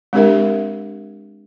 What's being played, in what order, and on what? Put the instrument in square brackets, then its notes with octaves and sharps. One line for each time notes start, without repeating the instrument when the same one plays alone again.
[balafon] G#3 C4 D4 G4 A#4 E5